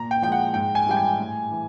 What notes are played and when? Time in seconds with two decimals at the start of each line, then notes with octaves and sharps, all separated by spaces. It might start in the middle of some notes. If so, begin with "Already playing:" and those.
Already playing: A#2 A#5
0.11 G5
0.22 F3 G#3 G5
0.32 F#5
0.54 G#2 G5
0.75 G#5
0.87 E3 G3 G5
0.97 G#5
1.19 A2
1.51 E3